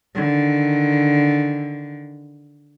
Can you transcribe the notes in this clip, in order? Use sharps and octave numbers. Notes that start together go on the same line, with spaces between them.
D3 D#3